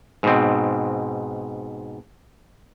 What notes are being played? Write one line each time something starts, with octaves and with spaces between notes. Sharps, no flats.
G#2 B2 C4